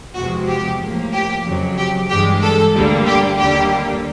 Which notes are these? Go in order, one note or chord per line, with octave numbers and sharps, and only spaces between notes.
E2 C3 F3 G#3 F#4
G4
A2 F3 A#3
G4
F2 C#3 F#3
G4
G2 E3 G#3 G4
A4
D2 D3 G3 A#3
G4
D#2 D3 G3 A#3 G4